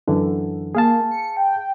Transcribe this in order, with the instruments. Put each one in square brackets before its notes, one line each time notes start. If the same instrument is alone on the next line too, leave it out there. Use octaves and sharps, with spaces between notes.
[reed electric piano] F#2 D3 E3
[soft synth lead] A#3 [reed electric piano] G#4 F5 A5
[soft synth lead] C#7
G5